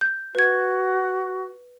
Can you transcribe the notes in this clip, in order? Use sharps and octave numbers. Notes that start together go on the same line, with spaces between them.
G6
F#4 B4 G#6